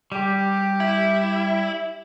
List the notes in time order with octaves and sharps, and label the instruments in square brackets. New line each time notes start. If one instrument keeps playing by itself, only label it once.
[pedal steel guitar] G3 [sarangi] G4
[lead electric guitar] E4